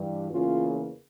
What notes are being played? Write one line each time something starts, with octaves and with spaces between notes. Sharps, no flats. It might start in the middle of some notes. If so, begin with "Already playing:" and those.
Already playing: G2 E3 G3
E2 C#3 E3 A#3 C#4 F4